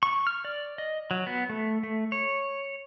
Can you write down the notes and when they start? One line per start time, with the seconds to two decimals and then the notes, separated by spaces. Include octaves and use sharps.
0.03 C#6
0.27 F6
0.45 D5
0.78 D#5
1.11 F#3
1.27 B3
1.50 A3
1.83 A3
2.12 C#5